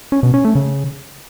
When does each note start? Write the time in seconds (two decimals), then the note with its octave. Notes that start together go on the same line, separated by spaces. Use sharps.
0.12 C#4
0.23 B2
0.34 C#4
0.44 A3
0.55 C#3